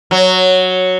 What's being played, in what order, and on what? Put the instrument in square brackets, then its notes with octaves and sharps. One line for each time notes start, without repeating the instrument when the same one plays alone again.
[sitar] F#3